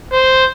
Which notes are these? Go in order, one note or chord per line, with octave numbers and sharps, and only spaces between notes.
C5